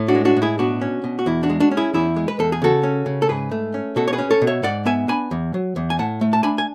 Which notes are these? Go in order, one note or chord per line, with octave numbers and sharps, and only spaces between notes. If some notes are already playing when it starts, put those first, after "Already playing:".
Already playing: A2
D4 F#4
G#3
D4 F#4
A2
E4 G#4
B2 D4 F#4
C#4
B2
F#4
E2 E4
D4 F#4
G#3
D4 F#4
C#4
E4 G#4
E2 E4 G#4
G#3
B4
E2 A4
G#4
C#3 F#4 A4
C#4
C#3
A4
G#2 G#4 B4
A3
C#4
B2 F#4 A4
C#5
G#4 B4
C#4
A4 C#5
B2
C#5 E5
G#2 D5 F#5
B3 E5 G#5
D4 G#5 B5
E2
F#3
E2
G#5
A2 F#5 A5
A3
A5
D4 G#5 B5
G#5